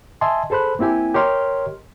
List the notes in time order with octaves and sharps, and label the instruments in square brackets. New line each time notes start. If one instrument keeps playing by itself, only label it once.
[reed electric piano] D#5 E5 G#5 A5 C6
G#4 A4 C5 B5 F#6
A#3 C4 E4 G4 G#5
G4 A#4 C#5 D#5 C6 F6